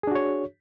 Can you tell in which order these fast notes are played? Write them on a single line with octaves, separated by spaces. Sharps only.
G#4 D4 F#4 C#5